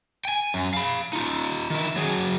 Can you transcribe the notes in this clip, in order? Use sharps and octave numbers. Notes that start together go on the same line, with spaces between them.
G5 G#5
F#2
F5 B5
D#4 F4
D#3 E4
F#3 G#4